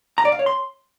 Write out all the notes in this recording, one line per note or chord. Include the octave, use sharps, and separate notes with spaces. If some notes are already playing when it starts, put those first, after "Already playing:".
A#5
D5
F5
C#5
C6